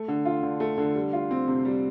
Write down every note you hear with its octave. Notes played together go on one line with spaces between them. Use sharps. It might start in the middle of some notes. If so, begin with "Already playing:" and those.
Already playing: A3
D3
F4
D3
A3
D3
G3
F4
C4
C3
G3